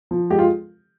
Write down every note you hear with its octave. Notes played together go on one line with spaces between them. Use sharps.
F3
G#3 G4
F4